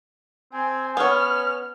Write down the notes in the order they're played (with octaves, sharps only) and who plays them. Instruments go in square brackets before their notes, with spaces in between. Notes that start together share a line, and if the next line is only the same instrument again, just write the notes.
[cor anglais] C4 [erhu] G#5
[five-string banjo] B3 C#5 [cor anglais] C#4 [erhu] F6